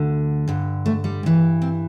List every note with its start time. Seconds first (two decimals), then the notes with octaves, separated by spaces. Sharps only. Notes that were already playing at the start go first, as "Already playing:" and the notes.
Already playing: D2 D3
0.48 G2 D3
0.86 A3
1.04 G3
1.23 G2 E3
1.62 C4